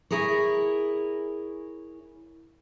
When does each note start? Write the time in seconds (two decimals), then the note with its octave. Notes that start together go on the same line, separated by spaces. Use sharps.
0.11 E4 G#4 A#4 C#5